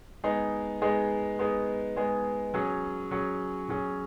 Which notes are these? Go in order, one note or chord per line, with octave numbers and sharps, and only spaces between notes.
G#3 B3 D#4 G#4
G#3 B3 D#4 G#4
G#3 B3 D#4 G#4
G#3 B3 D#4 G#4
F#3 C#4 G#4
F#3 C#4 G#4
F#3 C#4 G#4